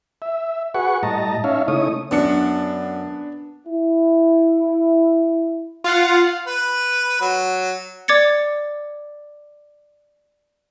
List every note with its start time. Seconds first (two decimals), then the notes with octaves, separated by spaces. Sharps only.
0.22 E5
0.74 F#4 G#4 B4 F#5 C#6
1.03 A2 G3 D#5 A5 A#5
1.44 C#4 D#4 C#5 E5 F5
1.68 C#3 A3 D#4 E4 C#5 D#6
2.11 F#2 B3 D4 C#7
3.66 E4
5.84 F4 F5 F#5
6.47 B4
7.21 F#3
8.08 D5 D6 G#6 A6 C#7